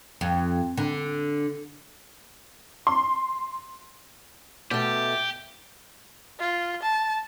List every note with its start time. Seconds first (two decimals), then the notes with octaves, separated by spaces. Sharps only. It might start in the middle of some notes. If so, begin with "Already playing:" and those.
0.21 F2
0.77 D3
2.87 C6
4.71 B2 A3 G4
6.40 F4
6.83 A5